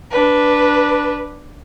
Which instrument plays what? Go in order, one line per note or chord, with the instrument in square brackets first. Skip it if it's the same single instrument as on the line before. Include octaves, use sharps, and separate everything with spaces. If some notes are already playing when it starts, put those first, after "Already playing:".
[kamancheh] D4 B4